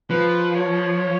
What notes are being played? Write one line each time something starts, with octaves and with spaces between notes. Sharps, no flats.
F3 B4
C#5